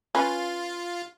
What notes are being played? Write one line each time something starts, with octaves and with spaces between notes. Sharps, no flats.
C#4 F4 B4